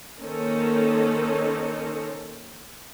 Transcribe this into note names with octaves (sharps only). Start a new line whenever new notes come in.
D#3 A#3 C#4 D#4 A4 C5